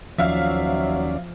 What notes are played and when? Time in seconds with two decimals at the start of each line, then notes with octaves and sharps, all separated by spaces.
0.19 D#2 F3 F#3 C#4 D5 E5 F5 F6